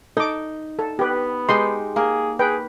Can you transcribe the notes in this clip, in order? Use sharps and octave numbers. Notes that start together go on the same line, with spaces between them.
D#4 A4 D6
A4
B3 G4 B4
G#3 D#4 G4 C6
A#3 G#4 A#4
G#4 B4 G5